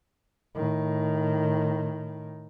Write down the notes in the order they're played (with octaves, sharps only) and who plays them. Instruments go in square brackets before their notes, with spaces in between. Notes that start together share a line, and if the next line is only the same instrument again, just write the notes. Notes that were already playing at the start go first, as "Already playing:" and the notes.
[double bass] A2 D#3